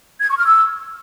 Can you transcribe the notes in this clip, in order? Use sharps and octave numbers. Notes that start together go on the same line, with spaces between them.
G#6
C#6
F6
E6